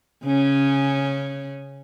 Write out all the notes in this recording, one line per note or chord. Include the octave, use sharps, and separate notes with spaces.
C#3 C#4